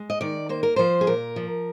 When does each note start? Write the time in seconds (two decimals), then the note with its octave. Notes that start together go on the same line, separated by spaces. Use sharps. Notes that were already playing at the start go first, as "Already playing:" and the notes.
Already playing: G#3
0.10 D#5
0.21 D#3 D5
0.49 A#3 C5
0.63 A#4
0.76 F3 C5
1.01 G#4
1.07 A#2 A#4
1.36 F3